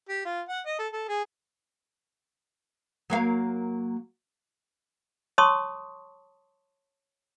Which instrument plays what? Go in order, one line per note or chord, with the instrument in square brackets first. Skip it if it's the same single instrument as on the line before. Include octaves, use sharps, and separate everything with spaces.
[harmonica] G4
F4
F#5
D#5
A4
A4
G#4
[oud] F#3 A#3 F5
[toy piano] C#5 A5 C6 C#6 D#6